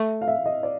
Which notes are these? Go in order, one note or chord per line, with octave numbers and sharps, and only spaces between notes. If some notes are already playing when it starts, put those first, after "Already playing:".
Already playing: A3
F5
E5
D#5
D5